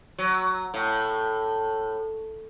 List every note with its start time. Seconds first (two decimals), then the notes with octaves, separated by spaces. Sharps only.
0.19 F#3
0.74 A2